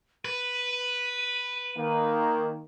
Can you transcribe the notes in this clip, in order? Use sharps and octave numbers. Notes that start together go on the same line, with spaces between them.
B4 D#7
D#3 A#3